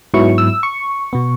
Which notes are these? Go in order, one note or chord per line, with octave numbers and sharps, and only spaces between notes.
G#2 F#3 B3 E4 C#6
E6
C#6
B2 B3